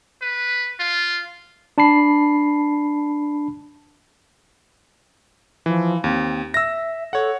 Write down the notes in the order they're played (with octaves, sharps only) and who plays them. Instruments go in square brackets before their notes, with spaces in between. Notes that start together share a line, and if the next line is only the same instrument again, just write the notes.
[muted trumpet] B4
F4
[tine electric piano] D4 A5 B5 C7
[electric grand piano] E3 [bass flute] F3
[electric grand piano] D#2 [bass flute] C4
[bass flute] E5 [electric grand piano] E6 A#6
[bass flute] A4 [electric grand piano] C#5 F#5